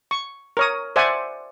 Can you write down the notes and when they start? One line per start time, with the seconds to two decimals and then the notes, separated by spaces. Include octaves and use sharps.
0.11 C#6
0.57 A#4 C#5 D#6
0.96 C5 D5 E5 F#5 G#5